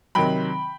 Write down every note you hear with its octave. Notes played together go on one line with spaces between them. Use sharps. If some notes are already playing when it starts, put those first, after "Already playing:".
C3 D#3 F#3 G5 B5